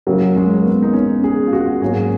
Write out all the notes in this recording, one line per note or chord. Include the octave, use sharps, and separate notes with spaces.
F#2 C#3 F#3 A#3
G#3
A#3
B3
D#4
C#4
G#4
F4
F#4
G#2 F#3 A#3 C#4 F#4 G#4